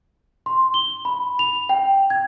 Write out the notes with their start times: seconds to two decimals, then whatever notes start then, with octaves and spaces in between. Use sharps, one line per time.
0.46 C6
0.74 G7
1.05 B5
1.39 F7
1.69 G5
2.10 G#6